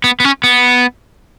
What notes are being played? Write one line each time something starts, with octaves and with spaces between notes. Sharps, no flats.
B3
B3
C#4
B3